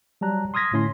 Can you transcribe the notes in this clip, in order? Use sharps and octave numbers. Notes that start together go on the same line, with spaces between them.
F#3 G3 A5 A#5 F#6
C6 D#6 F6 G#6 A#6 B6
A2 D3 C#4 C6